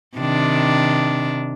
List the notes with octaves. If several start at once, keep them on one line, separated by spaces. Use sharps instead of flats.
C3 D#3 D4